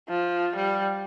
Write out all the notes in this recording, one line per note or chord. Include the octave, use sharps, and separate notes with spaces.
F3
G3